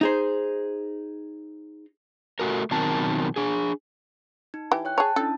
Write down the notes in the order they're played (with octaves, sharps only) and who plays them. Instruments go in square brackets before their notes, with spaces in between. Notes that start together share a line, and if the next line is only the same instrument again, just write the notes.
[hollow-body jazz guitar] D#4 G#4 C5
[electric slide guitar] A3 F#4 A#4
B2 D#3 F#3 C4 A#4 A5
D4 G#4
[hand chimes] D#4
[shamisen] E3 G4
[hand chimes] C#5 G5 F#6
[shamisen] G#4 C#5 [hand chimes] A5
[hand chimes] C#4 D4 E4 [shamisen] A4